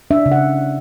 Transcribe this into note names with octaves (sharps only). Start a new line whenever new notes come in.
D4 E5
C#3
F#5